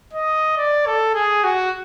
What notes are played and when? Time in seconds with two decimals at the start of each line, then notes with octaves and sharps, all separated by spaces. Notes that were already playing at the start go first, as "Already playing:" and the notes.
0.14 D#5
0.57 D5
0.86 A4
1.15 G#4
1.44 F#4